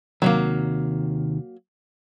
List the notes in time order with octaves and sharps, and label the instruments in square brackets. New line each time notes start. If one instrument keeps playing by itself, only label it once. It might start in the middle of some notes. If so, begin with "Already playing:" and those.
[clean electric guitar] D#2 C3 D#3 [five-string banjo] F#3 A3 A#3